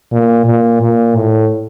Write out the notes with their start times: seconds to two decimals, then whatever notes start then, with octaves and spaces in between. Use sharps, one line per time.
0.12 A#2
0.46 A#2
0.81 A#2
1.16 A2